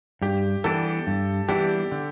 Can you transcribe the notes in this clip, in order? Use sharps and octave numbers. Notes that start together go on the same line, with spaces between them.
G2 G4
E3 G3 B3 D4 A4
G2
E3 G3 B3 D4 G4
D3